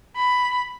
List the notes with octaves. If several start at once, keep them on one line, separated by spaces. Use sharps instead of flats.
B5